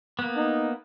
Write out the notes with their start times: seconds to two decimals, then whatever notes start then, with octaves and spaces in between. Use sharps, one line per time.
0.19 A#3 B3
0.36 D#4